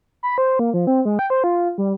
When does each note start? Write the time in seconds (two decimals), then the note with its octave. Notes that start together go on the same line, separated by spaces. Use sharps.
0.23 B5
0.38 C5
0.59 A#3
0.74 F3
0.87 C4
1.05 G#3
1.19 G5
1.30 C5
1.44 F4
1.78 G3